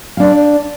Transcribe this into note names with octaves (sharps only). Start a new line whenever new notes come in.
D4 D5 F5